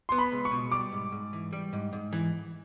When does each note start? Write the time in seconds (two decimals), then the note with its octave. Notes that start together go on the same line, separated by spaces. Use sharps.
0.09 B3 C6
0.18 B5
0.32 C#2
0.45 C#6
0.52 B2
0.72 G3 D6
0.92 G#2
1.12 G#2
1.33 E3
1.53 G3
1.73 G#2
1.93 G#2
2.13 E3